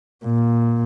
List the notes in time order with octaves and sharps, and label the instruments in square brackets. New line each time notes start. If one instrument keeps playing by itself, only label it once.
[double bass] A#2